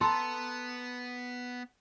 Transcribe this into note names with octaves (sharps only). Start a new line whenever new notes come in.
B3 A4 A#5 C6